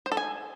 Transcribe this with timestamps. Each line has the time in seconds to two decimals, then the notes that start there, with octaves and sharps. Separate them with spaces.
0.06 C5
0.12 A4
0.17 G#5